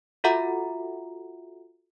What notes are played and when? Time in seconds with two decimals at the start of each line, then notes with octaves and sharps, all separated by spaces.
0.24 F4 F#4 A4 E5 F#5 A#5